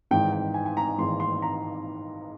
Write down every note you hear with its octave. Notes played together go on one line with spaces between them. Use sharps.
G#1 G#2 E3 G5
G5
G#5
G#5
A#5
G#1 G#2 E3 C6
C6
A#5